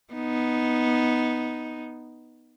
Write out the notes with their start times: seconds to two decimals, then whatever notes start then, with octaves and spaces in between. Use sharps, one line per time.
0.13 B3 D#4